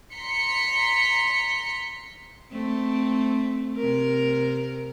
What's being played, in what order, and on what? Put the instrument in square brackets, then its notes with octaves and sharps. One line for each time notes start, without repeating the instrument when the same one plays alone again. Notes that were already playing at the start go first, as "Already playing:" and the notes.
[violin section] A#5 C6 B6 C#7
[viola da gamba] A3 C4
C3 A#4